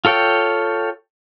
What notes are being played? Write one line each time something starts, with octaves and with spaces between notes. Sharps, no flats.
F4 A4 C#5 G5